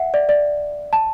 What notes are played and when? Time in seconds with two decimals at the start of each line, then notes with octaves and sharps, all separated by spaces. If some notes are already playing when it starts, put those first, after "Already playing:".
Already playing: E5 F#5
0.14 D5
0.29 D5
0.93 A5